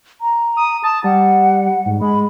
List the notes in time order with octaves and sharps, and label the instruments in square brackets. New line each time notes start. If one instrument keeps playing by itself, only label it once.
[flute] A#5
[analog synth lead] D#6
[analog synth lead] A5 [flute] D#6
[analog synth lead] G3 [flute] F#5
[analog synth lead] G#2
[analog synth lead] G#3 [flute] B5